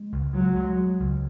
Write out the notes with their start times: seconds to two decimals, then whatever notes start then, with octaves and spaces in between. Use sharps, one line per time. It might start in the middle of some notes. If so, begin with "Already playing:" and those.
Already playing: G#3
0.12 C#2
0.33 F#3 G#3
0.55 G#3
0.77 G#3
1.00 C#2